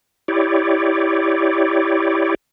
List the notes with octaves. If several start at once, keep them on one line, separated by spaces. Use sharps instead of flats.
E4 G4 C#5 D5